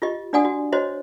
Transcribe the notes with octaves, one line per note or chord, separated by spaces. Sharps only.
F4 G4 D#5
D4 F#4 D5 F#5 G#5 D#6
F#4
F#4 C5 C#5 D#5